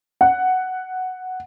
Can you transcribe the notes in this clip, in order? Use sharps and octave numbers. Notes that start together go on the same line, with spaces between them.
F#5